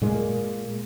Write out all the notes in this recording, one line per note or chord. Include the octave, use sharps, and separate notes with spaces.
A#2 G#3 A#3